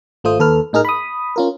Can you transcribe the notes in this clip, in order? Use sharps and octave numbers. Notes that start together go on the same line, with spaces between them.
G#1 A3 F4 C5 D#6
D#2 A4 B4 F6
A2 D#4 G#4 A#4 F6
B5 D#6
C#4 F4 A#4